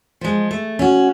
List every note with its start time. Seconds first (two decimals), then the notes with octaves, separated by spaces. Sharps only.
0.21 F3 G#3
0.51 A3
0.79 C#4 F#4